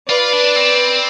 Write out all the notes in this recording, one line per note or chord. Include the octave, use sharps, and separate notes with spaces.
F4 B4 D5
D4
C4